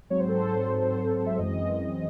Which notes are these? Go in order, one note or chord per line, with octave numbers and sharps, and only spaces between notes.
G#2 F#3 C4 C#5
C5
A4
C5
C5
E5
F#2 E3 G#3 C4 D#5